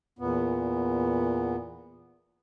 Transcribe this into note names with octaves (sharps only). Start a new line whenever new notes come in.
E2 A#2 B3